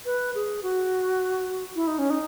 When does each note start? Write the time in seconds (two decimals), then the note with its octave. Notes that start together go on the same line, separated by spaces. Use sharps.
0.06 B4
0.35 G#4
0.63 F#4
1.76 E4
1.87 D#4
1.99 C#4
2.10 D#4